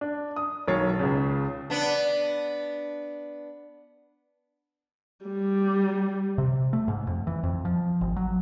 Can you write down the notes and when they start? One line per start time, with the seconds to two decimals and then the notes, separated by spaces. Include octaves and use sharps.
0.01 D4
0.36 D#6
0.68 B1 D#3 C#5 A6 C7
0.99 C#2 C#3
1.70 B3 D4
5.26 G3
6.38 C3
6.73 A3
6.88 G#2
7.07 F2
7.27 E3
7.43 F2
7.65 F3
8.01 G#1
8.16 F#3